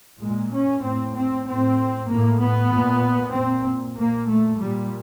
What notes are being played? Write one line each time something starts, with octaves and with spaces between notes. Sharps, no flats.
A#2 G#3
C#4
A2 C4
C4
A2 C4
A2 A#3
B3
A#2
A#2 C4
A#2 A#3
A3
A#2 G3